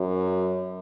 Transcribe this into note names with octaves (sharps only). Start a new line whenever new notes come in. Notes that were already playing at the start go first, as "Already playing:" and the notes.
Already playing: F#2